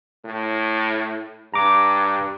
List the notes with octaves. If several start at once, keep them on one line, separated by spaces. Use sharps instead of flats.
A2
G2 A#5 D6